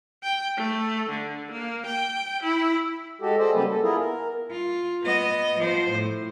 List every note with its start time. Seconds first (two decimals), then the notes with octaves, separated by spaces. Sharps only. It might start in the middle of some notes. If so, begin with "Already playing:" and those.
0.23 G5
0.57 A3
1.09 D3
1.51 A#3
1.86 G5
2.43 E4
3.21 G#3 F#4 G4 A4
3.39 G#4 A4 C5 D5 D#5
3.54 C#3 F#3 G3 A#3 G4 B4
3.68 A4
3.83 B3 E4 F4 G#4 A#4
4.00 A#4
4.51 F4
5.04 B3 D#5
5.59 F3 C5
5.92 A2